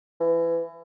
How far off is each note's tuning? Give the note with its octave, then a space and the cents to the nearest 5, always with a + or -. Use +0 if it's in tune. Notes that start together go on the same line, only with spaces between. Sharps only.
E3 +25